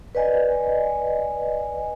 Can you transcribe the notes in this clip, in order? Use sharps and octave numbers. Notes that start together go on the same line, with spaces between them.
B4 D5 D#5 G#5